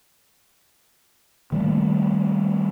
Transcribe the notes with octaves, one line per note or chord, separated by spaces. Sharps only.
D#3 G3 A3 A#3